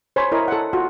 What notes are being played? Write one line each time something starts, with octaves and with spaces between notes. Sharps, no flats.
C5 C#5 G#5 B5
E4 A#4 C#5 D#5
A4 F#5
F4 F#4